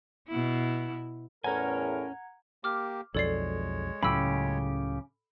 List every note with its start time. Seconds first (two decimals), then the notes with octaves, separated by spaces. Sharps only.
0.28 B2 E4
1.44 E2 A2 C#4 A#4 F#5 G#5 A#5 G#6
2.64 A#3 G4 D6 F6
3.15 B1 F2 G#3 A4 C#5 D5 C7
4.03 C#2 A2 C#3 F#3 G4 B5 E6